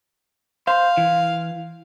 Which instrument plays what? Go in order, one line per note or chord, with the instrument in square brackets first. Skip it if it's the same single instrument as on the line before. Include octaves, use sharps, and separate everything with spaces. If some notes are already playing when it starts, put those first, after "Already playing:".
[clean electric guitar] C5 [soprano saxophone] F5
[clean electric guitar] E3